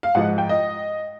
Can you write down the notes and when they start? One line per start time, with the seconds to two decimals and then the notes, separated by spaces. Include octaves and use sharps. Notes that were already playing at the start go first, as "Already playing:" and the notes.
0.03 F5
0.15 G#2 F3 G#3 F#5
0.38 G5
0.49 D#5